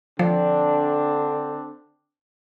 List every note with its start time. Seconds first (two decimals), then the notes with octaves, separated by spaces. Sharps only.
0.19 D3 F3 C4 D4